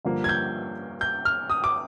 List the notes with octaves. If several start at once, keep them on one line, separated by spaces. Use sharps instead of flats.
G2 D3 F3 A#3
G#6
G6
G6
F6
D#6
D6